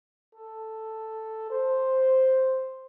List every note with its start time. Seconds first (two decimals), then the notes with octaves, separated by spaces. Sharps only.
0.35 A4
1.50 C5